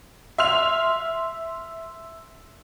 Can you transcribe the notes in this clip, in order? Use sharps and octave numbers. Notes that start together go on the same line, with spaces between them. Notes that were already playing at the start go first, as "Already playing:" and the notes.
E5 C6 F6 F7